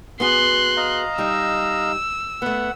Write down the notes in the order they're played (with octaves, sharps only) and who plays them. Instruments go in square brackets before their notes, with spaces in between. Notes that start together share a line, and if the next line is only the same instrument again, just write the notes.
[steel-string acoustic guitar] B3 F#4 G#4 [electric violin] C6 F#6
[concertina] D#5 F5 A#5
[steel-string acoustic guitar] G3 D#4 [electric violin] E6
[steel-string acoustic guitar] A3 B3 [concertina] F#5